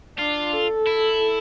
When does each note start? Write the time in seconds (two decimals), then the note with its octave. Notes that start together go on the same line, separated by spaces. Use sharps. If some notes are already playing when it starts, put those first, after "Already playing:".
0.19 D4 F4
0.53 A4
0.87 E4